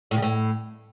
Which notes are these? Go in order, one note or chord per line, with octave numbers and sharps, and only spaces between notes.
A2
C#3
A2